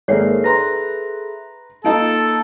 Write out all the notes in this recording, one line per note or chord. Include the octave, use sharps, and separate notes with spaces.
G#1 A#3 G#4 A4 C#5 D5 E5 C7
B4 A#5 C6 A#6
A#3 D#4 F4 A4 D7